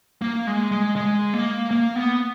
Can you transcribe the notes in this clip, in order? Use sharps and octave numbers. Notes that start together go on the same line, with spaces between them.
A#3
G#3
G#3
G#3
A#3
A#3
B3